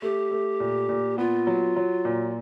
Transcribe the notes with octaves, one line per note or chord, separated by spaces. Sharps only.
A3 G4
A3
A#2
A#2
B3 F4
F#3
F#3
A#2